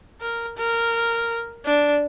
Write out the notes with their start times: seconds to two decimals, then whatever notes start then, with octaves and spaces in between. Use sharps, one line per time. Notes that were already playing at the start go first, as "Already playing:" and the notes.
0.21 A#4
0.57 A#4
1.65 D4